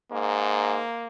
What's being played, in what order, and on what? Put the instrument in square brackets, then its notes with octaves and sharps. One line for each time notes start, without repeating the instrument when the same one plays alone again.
[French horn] G#2 [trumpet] A#3